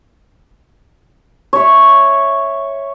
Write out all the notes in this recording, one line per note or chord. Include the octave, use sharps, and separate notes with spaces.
C#5 E5